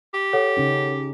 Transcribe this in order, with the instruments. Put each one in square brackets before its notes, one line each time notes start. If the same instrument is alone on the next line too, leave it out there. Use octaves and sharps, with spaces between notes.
[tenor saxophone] G4
[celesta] A4 C#5 F#5
[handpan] C#3 C#4 D#4